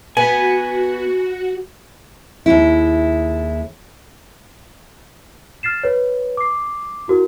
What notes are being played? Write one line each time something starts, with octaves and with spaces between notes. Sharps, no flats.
B3 F#4 G#5
D#2 G#3 D4 E4
F6 A6 C7 E7
B4 C#5
D6 C7
E4 F#4 A#4